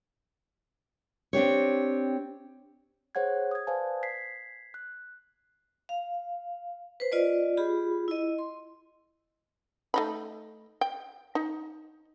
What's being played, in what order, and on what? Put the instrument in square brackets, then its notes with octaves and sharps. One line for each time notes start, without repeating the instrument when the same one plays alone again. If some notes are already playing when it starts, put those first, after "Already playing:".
[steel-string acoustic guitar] C4 D4 G4 C#5
[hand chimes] G#4 C5 C#5 F#5 F#6 G#6
D#6 G#6
B4 C5 D5 F5 G#5 A5
G#6 B6 C7
F#6
[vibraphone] F5
B4 C5
F4 D5 D#5
F4 G4 G#4 B5
E4 D#5
C6
[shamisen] A3 D#4 B5
G5
D#4